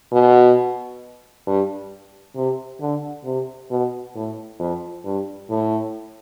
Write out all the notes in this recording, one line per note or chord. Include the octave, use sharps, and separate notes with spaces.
B2
G2
C3
D3
C3
B2
A2
F2
G2
A2